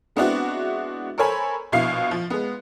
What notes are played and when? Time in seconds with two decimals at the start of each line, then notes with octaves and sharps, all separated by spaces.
0.16 G#3 B3 C4 D4 E4 F#4
1.18 A4 A#4 C5 C#5 G#5 B5
1.72 A#1 B2 E4 F5 C7
2.11 F3
2.30 G#3 B3